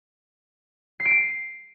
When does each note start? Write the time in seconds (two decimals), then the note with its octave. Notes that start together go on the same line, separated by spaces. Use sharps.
1.00 C7
1.05 D7
1.11 D#7